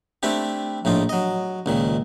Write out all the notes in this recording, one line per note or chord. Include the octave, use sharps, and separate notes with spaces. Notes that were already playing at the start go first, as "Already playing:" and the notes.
A3 C4 D4 E4 G4
A#1 A2 D#4 F4
F#3 D#5
C#2 A#2 D#3